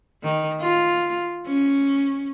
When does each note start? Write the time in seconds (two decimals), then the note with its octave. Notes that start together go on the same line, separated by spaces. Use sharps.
0.23 D#3
0.60 F4
1.46 C#4